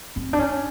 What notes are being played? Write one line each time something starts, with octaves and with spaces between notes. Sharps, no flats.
C4
D4
C#4